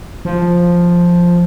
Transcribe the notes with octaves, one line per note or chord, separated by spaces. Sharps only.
F3